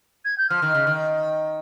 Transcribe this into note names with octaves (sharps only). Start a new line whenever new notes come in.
G#6
G6
F3 F6
D#3
C#3
D#3